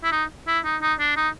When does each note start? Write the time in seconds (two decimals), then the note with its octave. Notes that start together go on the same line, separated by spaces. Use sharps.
0.04 E4
0.12 D#4
0.47 E4
0.65 D#4
0.82 D#4
0.99 D4
1.17 D#4